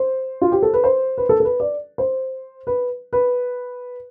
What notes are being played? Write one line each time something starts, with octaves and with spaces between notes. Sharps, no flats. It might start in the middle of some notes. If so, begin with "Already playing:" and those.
Already playing: C5
F4
G4
A4
B4
C5
B4
A4
A4
B4
D5
C5
B4
B4